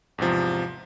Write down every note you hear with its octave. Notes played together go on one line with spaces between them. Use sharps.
E2 G#2 C3 F3